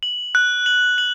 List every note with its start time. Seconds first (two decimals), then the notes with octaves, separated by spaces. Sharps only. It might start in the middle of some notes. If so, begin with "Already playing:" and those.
0.03 F#7
0.35 F#6
0.66 F#7
0.98 F#7